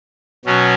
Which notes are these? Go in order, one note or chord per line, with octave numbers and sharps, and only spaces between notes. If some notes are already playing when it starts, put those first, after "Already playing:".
B2 F#3 C#4